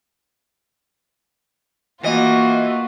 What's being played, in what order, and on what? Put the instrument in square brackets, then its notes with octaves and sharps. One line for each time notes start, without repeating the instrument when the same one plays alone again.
[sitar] E3 D#5 [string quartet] A#3 F4 F#4